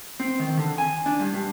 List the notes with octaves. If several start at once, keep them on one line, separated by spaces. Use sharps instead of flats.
C4
D#3
D3
G#5
D4
G2
G2